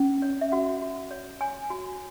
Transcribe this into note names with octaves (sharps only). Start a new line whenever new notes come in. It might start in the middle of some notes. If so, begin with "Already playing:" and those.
Already playing: C#4
C#5
E5
F#4 F#5
F#4
C#5
C#5 G#5
F#4